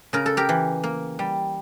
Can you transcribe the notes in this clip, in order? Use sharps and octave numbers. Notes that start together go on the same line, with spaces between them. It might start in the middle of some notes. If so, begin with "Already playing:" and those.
C#3 A#4
A4
G4 A#4
E3
A#3
G3